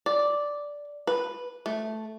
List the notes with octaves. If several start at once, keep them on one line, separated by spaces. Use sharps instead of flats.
D5
B4
A3